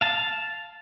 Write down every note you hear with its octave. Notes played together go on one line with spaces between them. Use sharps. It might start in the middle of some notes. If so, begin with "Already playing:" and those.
F5 A5